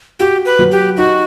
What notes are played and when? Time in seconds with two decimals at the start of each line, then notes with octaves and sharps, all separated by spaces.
0.19 F#4 G4
0.46 B4
0.59 F#3
0.72 G4
0.97 D#4 F#4